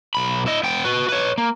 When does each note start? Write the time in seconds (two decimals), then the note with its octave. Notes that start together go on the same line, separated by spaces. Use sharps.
0.15 B1 B5
0.46 E4 D#5
0.63 B3 G5
0.85 F#4 B4
1.08 B4 C#5
1.38 A#3